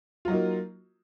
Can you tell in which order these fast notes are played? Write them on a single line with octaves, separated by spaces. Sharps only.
F4 F#3 D#4 A#3